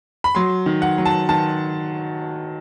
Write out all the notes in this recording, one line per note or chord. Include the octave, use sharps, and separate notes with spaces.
B5
F#3 C6
D#3
F#5
F#3
A5
D#3 A5